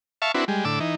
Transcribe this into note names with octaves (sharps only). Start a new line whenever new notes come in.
E5 F5 A5 C#6
C4 D4 E4 F#4 B4
G3 G#3
A2 D3 D6 E6
E3 D#4